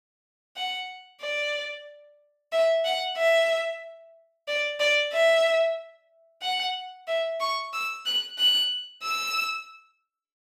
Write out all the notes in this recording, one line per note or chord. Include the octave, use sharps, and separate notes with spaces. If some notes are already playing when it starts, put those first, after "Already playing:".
F#5
D5
E5
F#5
E5
D5
D5
E5
F#5
E5
C#6
E6
F#6
F#6
E6